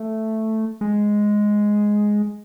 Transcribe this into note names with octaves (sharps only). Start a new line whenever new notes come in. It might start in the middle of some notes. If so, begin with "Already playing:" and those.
Already playing: A3
G#3